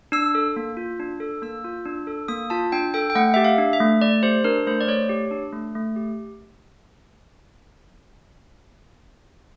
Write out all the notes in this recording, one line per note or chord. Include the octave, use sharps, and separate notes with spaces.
D4 E6
A4
A#3
F4
D4
A4
A#3 E6
F4
D4
A4
A#3 D#6
F4 A5
D4 G5
A4 G5
G5
A3 F#5
G4 E5
F5
D4
E5
A3
A3 D5
G4 C5
D4 A#4
A3 C5
D5
A3 C#5
G4
D4
A3
A3
G4